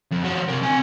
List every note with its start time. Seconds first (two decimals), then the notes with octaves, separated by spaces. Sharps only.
0.12 F2
0.23 F3 F#4
0.49 C3 A#4
0.63 C4 G#5